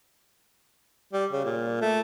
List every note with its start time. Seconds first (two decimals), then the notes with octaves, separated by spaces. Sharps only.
1.13 G3
1.32 C#3
1.45 A#2
1.81 A3